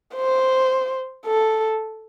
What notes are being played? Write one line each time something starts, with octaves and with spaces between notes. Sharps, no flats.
C5
A4